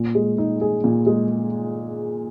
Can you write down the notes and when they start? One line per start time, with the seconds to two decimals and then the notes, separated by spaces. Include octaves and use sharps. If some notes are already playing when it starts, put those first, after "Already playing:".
Already playing: A#2
0.15 G#3
0.38 D#4
0.61 G#4
0.84 A#2
1.06 G#3